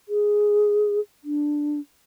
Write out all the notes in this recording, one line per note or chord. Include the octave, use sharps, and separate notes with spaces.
G#4
D4